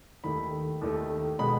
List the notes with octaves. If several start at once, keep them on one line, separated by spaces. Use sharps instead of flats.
D#2 D#3 A3 B5
D#2 D#3 A3
B2 G#3 B5